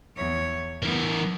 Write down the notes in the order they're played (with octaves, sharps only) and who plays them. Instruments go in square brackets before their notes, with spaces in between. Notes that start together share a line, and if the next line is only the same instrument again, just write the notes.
[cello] E2 C#5
[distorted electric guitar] E3 A#4 [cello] B3